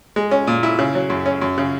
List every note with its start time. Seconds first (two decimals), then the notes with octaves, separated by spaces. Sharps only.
0.16 G#3
0.31 C#4
0.47 A#2
0.63 E4
0.79 C#3
0.95 F#3
1.10 F#2
1.26 C#4
1.42 F#2
1.58 C#3